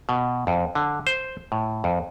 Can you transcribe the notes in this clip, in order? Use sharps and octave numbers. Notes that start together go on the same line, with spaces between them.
B2
F2
D3
C5
A2
F2